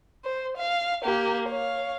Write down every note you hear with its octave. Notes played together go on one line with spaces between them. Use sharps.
C5
F5
A#3 G4
C#5 F5